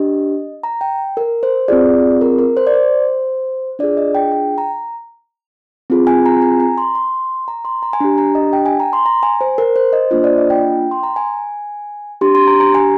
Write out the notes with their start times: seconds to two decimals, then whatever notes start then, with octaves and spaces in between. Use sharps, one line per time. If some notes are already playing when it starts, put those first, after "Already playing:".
Already playing: D4 G4 D#5
0.63 A#5
0.81 G5
1.17 A#4
1.43 C5
1.68 C4 F4 G#4 D5
2.21 A#4
2.38 A#4
2.57 C5
2.67 D5
2.74 C5
3.79 D4 F4 G#4 D5
3.97 D#5
4.15 G5
4.32 G5
4.58 A#5
5.90 C4 F4 G#4
6.07 G#5
6.26 A#5
6.42 G#5
6.60 A#5
6.78 C6
6.95 C6
7.48 A#5
7.65 C6
7.83 A#5
7.93 G#5
8.00 D4 G4 A#5
8.18 A#5
8.35 D#5
8.53 G5
8.66 G#5
8.80 A#5
8.93 C6
9.06 A#5
9.23 G#5
9.41 C5
9.58 A#4
9.76 C5
9.93 D#5
10.11 A#3 D4 F4 C5
10.24 D5
10.38 D#5
10.50 G5
10.91 C6
11.03 A#5
11.16 G#5
12.21 D4 G4 C6
12.35 C6
12.47 A#5
12.60 A#5
12.75 G#5